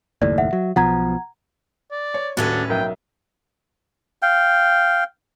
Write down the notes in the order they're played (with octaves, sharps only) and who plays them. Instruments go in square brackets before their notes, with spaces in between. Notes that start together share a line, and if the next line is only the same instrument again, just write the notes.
[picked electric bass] F#1 D#2 A2 [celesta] D5
[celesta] E5 F#5
[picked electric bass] F#3
[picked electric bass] B1 B2 F3 [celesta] F#5 A#5 G#6
[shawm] D5
[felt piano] C#5
[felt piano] D#1 F#4 A4 [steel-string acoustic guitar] A2 C#4 B4 [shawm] D4
[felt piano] B1 [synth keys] A#4 E5 [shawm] G5
[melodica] F5 G5